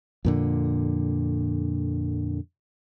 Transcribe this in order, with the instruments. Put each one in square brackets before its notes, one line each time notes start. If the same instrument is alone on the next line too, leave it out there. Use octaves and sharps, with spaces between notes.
[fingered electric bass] F2 A#2 D3